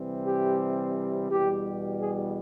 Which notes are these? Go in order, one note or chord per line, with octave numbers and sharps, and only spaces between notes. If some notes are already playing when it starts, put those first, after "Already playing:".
Already playing: C3 E3 G3 C4
G4
E2 B2 G3 G4
G#4